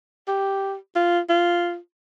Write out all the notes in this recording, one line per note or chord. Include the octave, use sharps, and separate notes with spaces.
G4
F4
F4